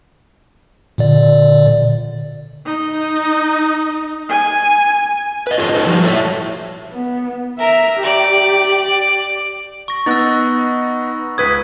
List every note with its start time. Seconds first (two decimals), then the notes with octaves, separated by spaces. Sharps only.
0.98 A#2 D3 D5
2.66 D#4
4.30 G#5
5.47 B4 D#5
5.58 F4 G#4 A4 C5 C#5 D#5
5.74 D#4 F4 A4 B4 C5
5.87 F3 G3 F#4 D5
6.03 E4 F4 A4 A#4 C#5 E5
6.91 B3
7.59 A#4 E5
8.03 G4 D5
9.88 C#6 A#6
10.06 B3 D#4 E6 F#6 A6
11.38 C#2 B4 D#6 G#6 B6